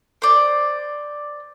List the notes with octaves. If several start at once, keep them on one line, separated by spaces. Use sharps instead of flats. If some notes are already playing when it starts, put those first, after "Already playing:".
C5 D5